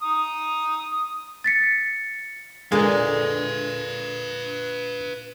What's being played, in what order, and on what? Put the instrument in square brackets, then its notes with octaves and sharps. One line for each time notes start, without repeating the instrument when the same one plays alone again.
[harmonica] A#5 D#6
[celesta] A6 B6 C#7
[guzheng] A#2 D3 [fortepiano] G#3 [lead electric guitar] B4 F5